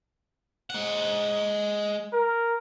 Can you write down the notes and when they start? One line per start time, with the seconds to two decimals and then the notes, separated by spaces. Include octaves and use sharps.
0.70 G#3 F#5
2.13 A#4